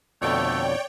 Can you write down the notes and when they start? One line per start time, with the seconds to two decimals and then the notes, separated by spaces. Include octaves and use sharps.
0.22 F2 B2 D3 A3 C#5 D5 G5